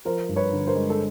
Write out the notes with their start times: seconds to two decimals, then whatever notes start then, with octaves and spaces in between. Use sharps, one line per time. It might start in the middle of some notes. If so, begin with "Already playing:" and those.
0.05 F3 A#4 C5
0.29 G2
0.36 B4 C#5
0.53 D3
0.67 A#4 C5
0.75 G#3
0.90 A4